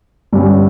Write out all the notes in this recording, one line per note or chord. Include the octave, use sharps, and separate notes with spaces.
G1 G2 G3 C#4